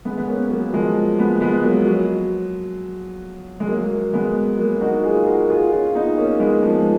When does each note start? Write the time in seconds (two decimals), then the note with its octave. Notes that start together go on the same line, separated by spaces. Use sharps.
0.05 G#3 B3
0.18 B3
0.28 A#3 C#4
0.50 F#3 A#3
0.73 F3 G#3
1.19 G#3 B3
1.41 G#3 B3
1.63 F#3 A#3
1.87 F#3
3.60 G#3
3.67 F#3 A#3
4.13 G#3 B3
4.58 F#3 A#3
4.81 D#4 F#4
5.04 F4 G#4
5.26 F#4 A#4
5.50 F4 G#4
5.72 C#4 F4
5.95 B3 D#4
6.17 A#3 C#4
6.40 G#3 B3
6.63 F3 G#3